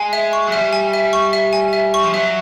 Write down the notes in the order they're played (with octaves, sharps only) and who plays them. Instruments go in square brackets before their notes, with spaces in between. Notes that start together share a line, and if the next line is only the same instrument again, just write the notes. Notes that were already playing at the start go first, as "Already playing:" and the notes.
Already playing: [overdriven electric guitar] G#3 [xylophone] G#5
[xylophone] E5
C#6
[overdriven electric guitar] F#3
[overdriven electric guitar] G3 [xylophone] E5
[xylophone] G#5
E5
C#6
E5
G#5
E5
C#6
[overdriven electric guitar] F3
[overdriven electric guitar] F#3 [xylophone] E5